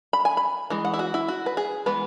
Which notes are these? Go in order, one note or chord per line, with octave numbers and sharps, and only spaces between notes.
B5
G#5
B5
E3 G#3
F#5
E4
F#4
E4
F#4
B4
G#4
E3 G#3 B3 B4